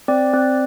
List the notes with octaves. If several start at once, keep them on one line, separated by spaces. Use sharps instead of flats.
C4 D5
C4